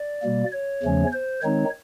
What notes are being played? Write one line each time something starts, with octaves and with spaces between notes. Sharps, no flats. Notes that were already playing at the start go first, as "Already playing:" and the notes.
Already playing: D5
B2 G3 A#3
C#5
E2 C#3 F3 A3 C#4
C5
D#3 G#3 C4 D#4 C#5